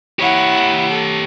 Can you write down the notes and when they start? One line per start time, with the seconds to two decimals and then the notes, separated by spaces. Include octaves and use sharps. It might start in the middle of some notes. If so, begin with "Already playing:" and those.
0.19 E4 G4 C#5 F#5
0.89 A4